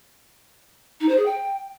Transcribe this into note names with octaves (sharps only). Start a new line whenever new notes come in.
D#4
C5
G#4
G5